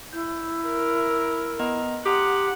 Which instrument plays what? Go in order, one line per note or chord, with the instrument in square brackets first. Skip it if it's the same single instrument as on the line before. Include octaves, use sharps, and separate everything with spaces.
[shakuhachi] E4 [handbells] G6
[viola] A#4
[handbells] B3 D#5 A#5
[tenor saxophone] G4 [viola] F#5 [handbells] A#5 C6 D#6